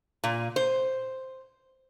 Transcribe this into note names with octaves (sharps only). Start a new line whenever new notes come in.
A#2
C5